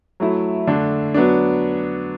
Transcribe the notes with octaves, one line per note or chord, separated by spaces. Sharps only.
F#3 A3 E4
D3 A3 D4
F#3 B3 D4